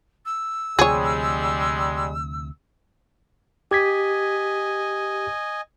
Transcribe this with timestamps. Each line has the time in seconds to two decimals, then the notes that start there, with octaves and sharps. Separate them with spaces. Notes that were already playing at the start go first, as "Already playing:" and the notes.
0.25 E6
0.79 D2 C3 F3 G3 G#3 G#4 C#5
3.71 G4 D#5 G#5 G#6 B6